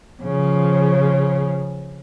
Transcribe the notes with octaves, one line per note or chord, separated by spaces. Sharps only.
C#3 F3